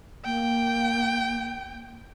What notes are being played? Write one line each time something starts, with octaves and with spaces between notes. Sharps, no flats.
A#3 G5